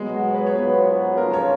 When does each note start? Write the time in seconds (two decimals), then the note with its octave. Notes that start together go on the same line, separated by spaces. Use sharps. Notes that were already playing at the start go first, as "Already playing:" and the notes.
Already playing: B2 F#3 G#3 B3
0.14 F#4
0.29 C#5
0.34 B4
0.47 C#5
0.56 G#2 F#3 B3 F4 B4
1.17 F2 C#3 F3 A#3 F4 A#4
1.33 C#5